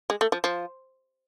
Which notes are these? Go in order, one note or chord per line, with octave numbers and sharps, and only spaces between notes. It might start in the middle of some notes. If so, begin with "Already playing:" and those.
G#3
A3
F3
F3